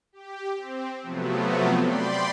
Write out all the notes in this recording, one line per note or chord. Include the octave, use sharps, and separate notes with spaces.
G4
C4
C3 F3 F#3 A3 B3
D5 G5 B5 C6